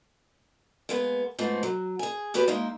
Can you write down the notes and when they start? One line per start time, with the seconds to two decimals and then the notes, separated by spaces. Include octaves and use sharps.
0.89 G#3 A#3 B3
1.39 G#2 F3 A3 B3 C4
1.63 F#3
1.99 G#4 G#5
2.34 E2 F#4 G4 B4 G#5
2.48 G#3 A#3 D#4 E4